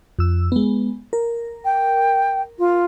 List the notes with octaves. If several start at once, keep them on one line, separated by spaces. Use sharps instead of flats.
F2 E6
G#3 B3
A#4
G5
F4